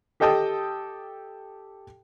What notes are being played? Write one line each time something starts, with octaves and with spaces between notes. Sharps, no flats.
G4 A4 D#5 G5 A5 D#6